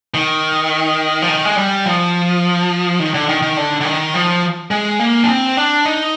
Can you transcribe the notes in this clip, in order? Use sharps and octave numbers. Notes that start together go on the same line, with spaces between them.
D#3
F3
D#3
G#3
G3
F3
D#3
D3
D#3
D#3
D3
D3
D#3
F3
G#3
A#3
D4
C4
D4
D#4